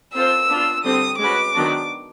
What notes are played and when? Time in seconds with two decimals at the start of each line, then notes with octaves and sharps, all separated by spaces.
0.14 C4 F4 A4 C5 E6
0.48 B3 D4 F4
0.84 D3 G3 C4 D#6
1.18 G#3 C#4 F#4 B4 D6
1.54 D#3 F#3 B3 D4 F#4